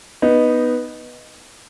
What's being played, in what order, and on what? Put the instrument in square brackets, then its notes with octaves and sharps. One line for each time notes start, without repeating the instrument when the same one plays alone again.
[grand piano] B3 D#4